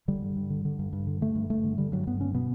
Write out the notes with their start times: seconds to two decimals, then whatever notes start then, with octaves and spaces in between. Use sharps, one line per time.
0.08 D3 G3
0.22 G2
0.36 G2
0.50 D3
0.65 D3
0.79 G2
0.93 G2
1.07 D3
1.21 D3 A3
1.35 G2
1.50 G2 A3
1.64 D3
1.78 D3 G3
1.92 G2 F#3
2.07 G2 B3
2.21 D3 C#4
2.34 B2 B3